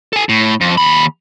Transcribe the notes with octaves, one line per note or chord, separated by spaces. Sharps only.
A4 G#5
A2
F2
D#2 B5